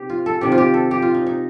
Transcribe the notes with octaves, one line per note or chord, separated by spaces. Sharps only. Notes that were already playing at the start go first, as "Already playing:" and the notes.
Already playing: C3 D#4 G4
F4
A4
C3 D#3 G3 G4
F4
G4
A4
G4
F4
D#4
D#4